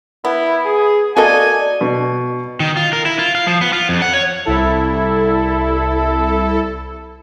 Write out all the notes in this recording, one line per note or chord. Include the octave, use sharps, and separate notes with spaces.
B3 E4
G#4
A#3 F#4 A4 D5 D#5 G#5
B2
D#3
F4
A#4
E4
F4
F5
F3
B3
F4
F2
F#5
C#5
C2 E4 A4